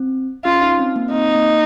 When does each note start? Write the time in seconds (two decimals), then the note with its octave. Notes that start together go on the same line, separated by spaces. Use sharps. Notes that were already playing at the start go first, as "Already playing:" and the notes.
Already playing: C4
0.45 C#4 F4
0.62 D#4
0.79 C4
0.96 A#3
1.12 C4 D#4
1.35 A#3